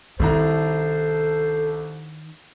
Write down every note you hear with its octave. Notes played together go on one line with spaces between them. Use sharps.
C2 D#3 E4 A4 C5 A#5